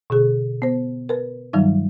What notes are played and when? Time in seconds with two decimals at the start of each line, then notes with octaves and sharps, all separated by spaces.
0.10 B2 D3 G#4
0.62 B3 C5
1.09 A#4 B4
1.53 G2 D#3 F#3 G3 D#4